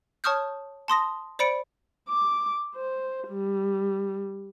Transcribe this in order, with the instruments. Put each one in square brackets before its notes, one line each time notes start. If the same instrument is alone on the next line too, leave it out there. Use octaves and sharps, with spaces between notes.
[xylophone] C#5 A5 C#6 D#6 F6 G6
A5 C6 D#6 A#6
C5 D5 B5 C#7 D7
[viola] D6
C5
G3